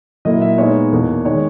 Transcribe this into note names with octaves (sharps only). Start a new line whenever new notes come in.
A#2 F#3 A#3 E4 D#5
E5
A#2 G#3 B3 D#4 C#5
E2 B2 A#3
D#3 G#3 C#5